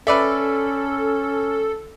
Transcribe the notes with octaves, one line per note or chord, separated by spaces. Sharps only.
C#4 A4 B4 D5 E5